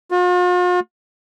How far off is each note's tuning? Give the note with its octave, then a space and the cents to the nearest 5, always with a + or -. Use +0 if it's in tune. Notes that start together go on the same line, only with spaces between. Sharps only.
F4 +45